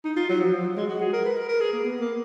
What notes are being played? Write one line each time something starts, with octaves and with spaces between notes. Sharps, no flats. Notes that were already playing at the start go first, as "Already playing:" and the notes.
D#4
F4
F#3
F3
F3
F#3
G#3
F#4
G#4
A#4
B4
A#4
A#4
G#4
A#3
B3
A#3